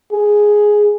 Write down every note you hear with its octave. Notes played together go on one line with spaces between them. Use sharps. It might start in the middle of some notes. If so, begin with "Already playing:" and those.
G#4